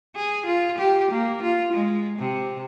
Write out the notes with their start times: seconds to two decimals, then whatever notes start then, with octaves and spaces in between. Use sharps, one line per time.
0.16 G#4
0.46 F4
0.79 G4
1.11 A#3
1.43 F4
1.73 G#3
2.19 C3